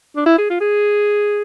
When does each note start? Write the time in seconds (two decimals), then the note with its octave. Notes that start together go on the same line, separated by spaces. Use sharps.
0.16 D4
0.26 E4
0.38 G#4
0.50 F4
0.61 G#4